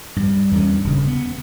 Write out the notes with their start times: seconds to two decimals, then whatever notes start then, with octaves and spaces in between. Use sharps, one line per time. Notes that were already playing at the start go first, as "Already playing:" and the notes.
0.16 G2
0.51 E2 G2 E3 C#4
0.84 D#1 C#3
1.07 B3